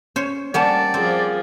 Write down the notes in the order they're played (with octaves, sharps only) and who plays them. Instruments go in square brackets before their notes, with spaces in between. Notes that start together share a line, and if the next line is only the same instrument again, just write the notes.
[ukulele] C#4 [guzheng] C5 C#5
[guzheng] G3 A#3 C#4 [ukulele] C5 F#5 A5 [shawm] D5
[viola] F3 G#4 [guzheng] C4